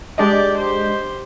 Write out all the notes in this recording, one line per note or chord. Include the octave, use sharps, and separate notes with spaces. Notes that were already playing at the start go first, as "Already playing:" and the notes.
G#3 D4 G4 D5 D#5
G4 C5